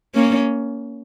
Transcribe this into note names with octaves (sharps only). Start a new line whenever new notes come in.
A#3 C#4